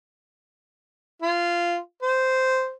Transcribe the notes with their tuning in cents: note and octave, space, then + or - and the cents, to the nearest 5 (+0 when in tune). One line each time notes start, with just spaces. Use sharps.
F4 -15
C5 -10